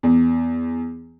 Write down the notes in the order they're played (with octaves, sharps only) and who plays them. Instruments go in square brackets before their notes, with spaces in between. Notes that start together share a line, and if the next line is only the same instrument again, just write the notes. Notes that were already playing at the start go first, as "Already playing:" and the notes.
[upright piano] E2